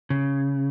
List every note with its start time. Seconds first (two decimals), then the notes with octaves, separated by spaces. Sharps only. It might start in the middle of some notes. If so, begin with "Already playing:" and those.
0.10 C#3